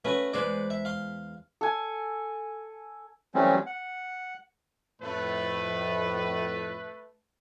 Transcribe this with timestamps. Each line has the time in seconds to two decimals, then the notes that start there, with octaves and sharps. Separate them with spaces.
0.05 A3 C#4 F#4 B4
0.33 E2 G#3 B4 C5 D5
0.70 E5
0.85 F5 C6
1.61 A4 G#5
3.34 E3 F#3 G3 A3 C4 C#4
3.66 F#5
5.02 F2 A2 A3 B4